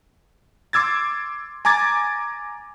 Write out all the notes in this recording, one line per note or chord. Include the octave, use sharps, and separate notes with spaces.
C6 D6 E6 G#6 A6
G#5 A#5 D6 G#6 A6